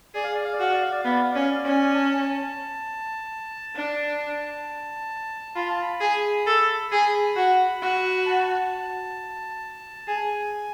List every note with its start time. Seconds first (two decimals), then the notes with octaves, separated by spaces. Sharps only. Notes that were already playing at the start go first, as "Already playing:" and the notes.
0.14 G#4 D5
0.24 F5
0.34 D5
0.44 F5
0.53 D5
0.60 F#4 F5
0.73 D5
0.82 F5
0.91 D5
1.02 B3 F5
1.11 D5
1.21 F5
1.31 C#4 D5
1.40 F5
1.50 D5
1.65 C#4
1.84 G#5
1.95 A5
3.76 D4
5.56 F4 B5
5.69 A5
5.82 B5
6.00 G#4
6.47 A4
6.92 G#4
7.36 F#4
7.82 F#4
8.26 A5
10.08 G#4 G#5